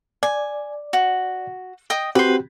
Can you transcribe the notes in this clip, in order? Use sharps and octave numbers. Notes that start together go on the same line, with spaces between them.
D5 G#5
F#4
D#5 G5 D#6
C4 F#4 G4 B4 C5